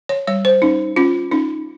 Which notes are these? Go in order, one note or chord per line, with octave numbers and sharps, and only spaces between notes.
C#5
G3 C#5
C5
C#4 D#4
C#4 F4
C#4 D#4